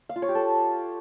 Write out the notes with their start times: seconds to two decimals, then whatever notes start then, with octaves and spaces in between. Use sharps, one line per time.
0.09 F5
0.16 F4
0.22 C#5
0.29 G4
0.35 A4